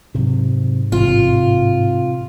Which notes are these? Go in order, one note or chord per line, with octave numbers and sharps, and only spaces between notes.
G#2 C3 F#3 C4
A1 C3 G3 F4